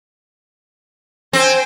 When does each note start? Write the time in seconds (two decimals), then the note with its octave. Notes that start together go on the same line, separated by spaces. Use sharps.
1.33 C4 C5 G5 G#5